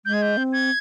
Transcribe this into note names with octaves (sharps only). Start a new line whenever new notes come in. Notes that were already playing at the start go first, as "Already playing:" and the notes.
G#3 G6
G#6
G6
C4
G#6